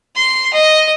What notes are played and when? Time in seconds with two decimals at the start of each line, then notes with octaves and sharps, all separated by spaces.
0.16 C6
0.53 D#5